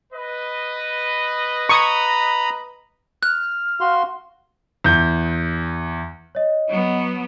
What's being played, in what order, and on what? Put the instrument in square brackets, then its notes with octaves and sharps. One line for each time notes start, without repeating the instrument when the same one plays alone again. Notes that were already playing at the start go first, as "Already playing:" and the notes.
[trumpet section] B4 D#5
[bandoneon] A#5 B5 [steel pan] C#6 D#6
[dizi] F6 [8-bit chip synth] F#6
[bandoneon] F#4 C6 [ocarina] F5
[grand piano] E2 G6
[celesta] C#5 D#5
[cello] F#3 B3